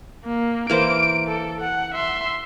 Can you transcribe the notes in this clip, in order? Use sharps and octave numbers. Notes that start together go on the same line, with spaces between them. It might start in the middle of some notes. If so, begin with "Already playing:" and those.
A#3
E3 A#3 C5 D7
A4
F#5
E5 C6